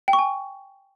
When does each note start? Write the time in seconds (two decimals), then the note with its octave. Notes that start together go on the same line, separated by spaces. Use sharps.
0.08 G5
0.13 C#6
0.19 G#5